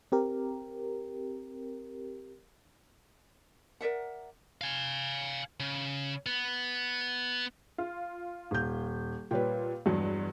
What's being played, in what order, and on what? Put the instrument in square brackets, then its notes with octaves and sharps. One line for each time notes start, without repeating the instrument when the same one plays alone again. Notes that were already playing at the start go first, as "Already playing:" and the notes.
[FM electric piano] C4 G4 A#4
[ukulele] A#4 D5 E5 F#5
[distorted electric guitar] F5 G#5
C#3
B3
[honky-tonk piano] F4
[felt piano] D#1 G6
[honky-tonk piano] A#2 G3 [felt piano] B4 C#5 G5
[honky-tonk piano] E2 F#3 G#3 [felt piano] G2